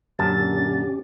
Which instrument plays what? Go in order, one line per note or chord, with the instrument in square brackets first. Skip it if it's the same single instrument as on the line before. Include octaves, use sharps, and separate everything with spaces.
[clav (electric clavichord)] F#2 A5 [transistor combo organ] A#2 D3 [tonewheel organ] C#4 G4 [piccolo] A6